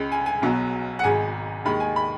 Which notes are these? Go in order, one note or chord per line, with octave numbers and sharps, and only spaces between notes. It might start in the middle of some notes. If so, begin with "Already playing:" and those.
Already playing: C#2 C#3 G#3
G#5
G#5
B1 B2 F#3
F#5
G#1 G#2 G#3 G#5
D#2 D#3 G#3 B5
G#5
B5